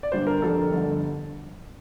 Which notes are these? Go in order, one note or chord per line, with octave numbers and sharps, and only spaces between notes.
D5
G1 G2 D3 G3 C5
A#4
F2 D3 G3 A4
G1 F2 D3